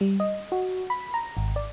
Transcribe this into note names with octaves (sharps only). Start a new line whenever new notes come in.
G3
D#5
F#4
B5
A#5
G#1
D5